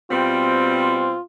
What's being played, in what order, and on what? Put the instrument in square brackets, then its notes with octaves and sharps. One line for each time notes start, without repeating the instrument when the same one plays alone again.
[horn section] B2 G3 C4 [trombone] F4